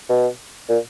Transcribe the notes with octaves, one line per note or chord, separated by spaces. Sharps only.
B2
A#2